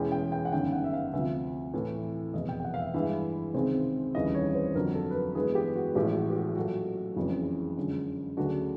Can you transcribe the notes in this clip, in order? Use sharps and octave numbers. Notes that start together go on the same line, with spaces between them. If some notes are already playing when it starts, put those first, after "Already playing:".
Already playing: E2 B2 G#3 C#4 E4 G5
G5
G5
F#5
G1 F#2 D#3 G5
F#5
E5
F5
D2 C3 F3 E5
A2 E3 A3
F1 E2 B2 D#5
G5
G5
F#5
F5
E5
G2 E3 G#3 E5
C#2 C3 D#3 G#3 C4
F1 D#2 C#3 E3 G3 D#5
C#5
C5
F2 D3 F#3 A#4
A4
B4
A#4
G2 E3 G#3 B3 G#4
G4
F#4
A1 A2 F3 G#3 G4
F#4
G4
F#4
A#2 F#3 A3 F#4
F#1 F2 C#3 E3 G#3
F#2 D3 F3 G#3
D2 C#3 F#3 A3 D4 F#4